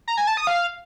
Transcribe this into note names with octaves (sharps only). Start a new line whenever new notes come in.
A#5
G#5
A5
D#6
F5